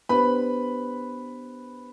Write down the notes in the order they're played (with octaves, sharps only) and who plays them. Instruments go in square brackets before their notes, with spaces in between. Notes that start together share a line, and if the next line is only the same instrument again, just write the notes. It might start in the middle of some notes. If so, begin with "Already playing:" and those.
[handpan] B3 D4 G4 C5 [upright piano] B4 B5